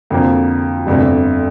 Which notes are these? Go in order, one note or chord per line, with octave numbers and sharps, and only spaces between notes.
F2 D3 F3 A#3
G1 F2 D3 A3